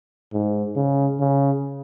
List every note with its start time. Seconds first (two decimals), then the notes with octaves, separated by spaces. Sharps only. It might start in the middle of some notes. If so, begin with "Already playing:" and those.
0.33 G#2
0.76 C#3
1.20 C#3